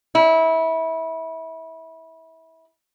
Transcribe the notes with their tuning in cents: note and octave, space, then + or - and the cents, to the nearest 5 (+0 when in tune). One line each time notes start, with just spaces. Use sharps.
E4 -25